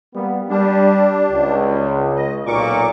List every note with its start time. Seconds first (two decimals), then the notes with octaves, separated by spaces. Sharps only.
0.15 G3 A#3 B3
0.50 G3 D4
1.31 C#2
2.16 D#5
2.46 B1 A#2 C#6 D6